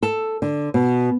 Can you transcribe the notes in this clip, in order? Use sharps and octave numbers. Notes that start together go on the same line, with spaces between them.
A4
D3
B2